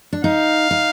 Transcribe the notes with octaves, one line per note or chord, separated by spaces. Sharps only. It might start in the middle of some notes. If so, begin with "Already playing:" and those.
D4
D#4 F5
D#4